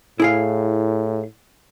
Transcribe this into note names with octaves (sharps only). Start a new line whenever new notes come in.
A2 E4 G#4 F5